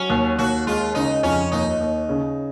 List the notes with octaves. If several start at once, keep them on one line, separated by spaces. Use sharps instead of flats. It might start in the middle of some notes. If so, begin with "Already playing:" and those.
Already playing: F#3 C#4
D#2
D#2 F#4
G#3 F4
C#3 D#4
F2 C#4
D#2 D#4
D#2
C#3